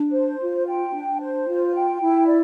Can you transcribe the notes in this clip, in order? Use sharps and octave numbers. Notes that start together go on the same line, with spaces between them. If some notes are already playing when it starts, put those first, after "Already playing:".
Already playing: D4
C5
F4
G5
D4
C5
F4
G5
E4
D5